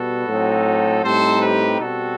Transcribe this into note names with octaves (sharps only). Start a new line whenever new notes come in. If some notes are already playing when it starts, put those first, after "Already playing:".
Already playing: B2 G3 B3 F#4 A4
A2 F#3 C4 D#4
A2 G3 C4 D#4 A4 C5
G4 B4
B2 G3 C4 F#4 A4